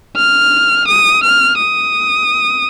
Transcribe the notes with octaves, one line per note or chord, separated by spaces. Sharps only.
F6
D#6
F6
D#6